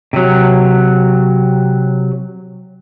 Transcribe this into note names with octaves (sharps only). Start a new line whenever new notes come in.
C3 F#3